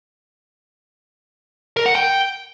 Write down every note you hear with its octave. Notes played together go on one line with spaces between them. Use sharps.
A#4
F#5
G5